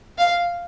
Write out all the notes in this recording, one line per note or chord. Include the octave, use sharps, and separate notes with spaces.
F5